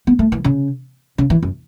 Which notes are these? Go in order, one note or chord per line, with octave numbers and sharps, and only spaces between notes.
B3
A3
E3
C#3
C#3
E3
F#2